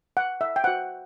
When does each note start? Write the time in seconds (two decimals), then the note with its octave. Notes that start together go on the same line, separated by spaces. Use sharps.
0.17 F#5
0.41 E5
0.56 G5
0.64 F#4 C5 F#5